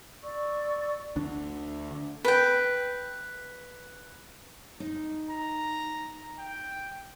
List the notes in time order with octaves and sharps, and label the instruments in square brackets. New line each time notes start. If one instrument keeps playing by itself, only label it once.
[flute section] D5 C#6 E6
[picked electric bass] D2 D3 D4
[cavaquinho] B4 G5
[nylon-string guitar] D#4
[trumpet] A#5
G5